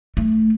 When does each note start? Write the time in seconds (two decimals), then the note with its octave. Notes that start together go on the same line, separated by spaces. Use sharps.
0.17 A3